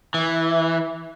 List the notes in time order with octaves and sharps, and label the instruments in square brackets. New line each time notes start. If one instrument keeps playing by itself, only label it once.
[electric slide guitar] E3